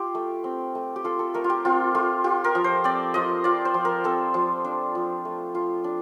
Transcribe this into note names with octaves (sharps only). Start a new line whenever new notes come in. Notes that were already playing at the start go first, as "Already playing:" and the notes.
Already playing: F4 G4
A3
C4
A3
G4
F4 A4
A4
A3 A#4
F4
G4
C4 F4
A3 F4
F4 G4
A#4
F3
C5
C4 D5
F3 D#5
F4 D5
C5
F3
A#4
C4 A4
F3
D4
F3
A3
F4
D4